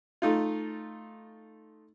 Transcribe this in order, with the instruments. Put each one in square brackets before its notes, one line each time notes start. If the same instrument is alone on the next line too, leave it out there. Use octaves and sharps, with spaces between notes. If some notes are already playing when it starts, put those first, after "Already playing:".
[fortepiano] A3 D#4 F4